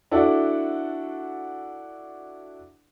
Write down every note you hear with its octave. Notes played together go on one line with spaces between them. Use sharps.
D4 E4 F#4 A4 D5